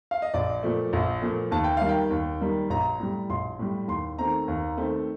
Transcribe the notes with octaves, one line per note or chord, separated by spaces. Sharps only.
F5
D#5
A#1 D5
A#2 F3 A3
A#1
A#2 F3 A3
D#2 A5
G5
D#3 G3 A#3 F5
G5
D#2
D#3 G3 A#3
A#1 A#5
A2 G3
A#1 C6
A2 G3
D#2 C6
D#3 A3 C4 A#5
D#2
D#3 A3 C4